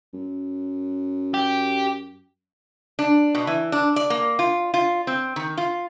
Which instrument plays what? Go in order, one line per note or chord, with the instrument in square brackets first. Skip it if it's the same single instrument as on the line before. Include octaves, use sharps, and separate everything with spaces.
[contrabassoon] F#2
[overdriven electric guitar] G4
[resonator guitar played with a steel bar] D4
B2
E3
D4
D5
A#3
F4
F4
C4
D#3
F4